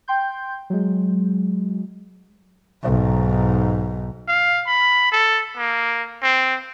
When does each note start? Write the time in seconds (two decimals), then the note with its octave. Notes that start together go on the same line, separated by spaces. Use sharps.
0.08 G5 C6 G6
0.70 F#3 G#3
2.84 B1 G#2
4.28 F5
4.67 B5
5.12 A4
5.57 A#3
6.23 C4